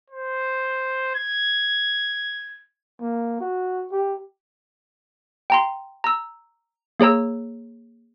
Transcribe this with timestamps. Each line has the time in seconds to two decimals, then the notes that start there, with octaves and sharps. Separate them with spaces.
0.10 C5
1.15 G#6
3.01 A#3
3.40 F#4
3.92 G4
5.50 G5 A#5 C6
6.04 A#5 E6
7.00 A#3 G#4 C#5 A#5 E6